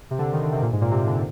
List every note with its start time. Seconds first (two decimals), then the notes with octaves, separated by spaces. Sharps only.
0.11 C3
0.19 D3
0.33 D#3
0.43 D3
0.53 C3
0.62 A#2
0.73 G#2
0.81 A#2
0.91 C3
1.07 D3